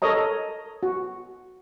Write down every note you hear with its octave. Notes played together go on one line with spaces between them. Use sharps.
A4 A#4 C#5 D#5 A#5
F#4